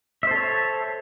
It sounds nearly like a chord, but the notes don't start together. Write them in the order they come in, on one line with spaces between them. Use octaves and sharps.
E5 C5 A4 C#5